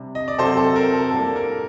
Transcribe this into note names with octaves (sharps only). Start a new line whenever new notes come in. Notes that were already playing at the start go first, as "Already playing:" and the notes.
Already playing: C3 G3 D4
D#5
D5
C3 F#3 C4 A4 C5
A4
A#4
A4
A2 G3 A#3 D4 A4
A#4